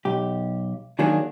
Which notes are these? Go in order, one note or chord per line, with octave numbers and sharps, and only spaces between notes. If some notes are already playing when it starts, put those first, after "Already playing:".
B1 G4
D#3 F#3 A#3 D4 G#4